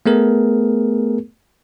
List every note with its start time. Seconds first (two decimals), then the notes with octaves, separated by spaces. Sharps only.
0.06 A3 B3 G#4 A#4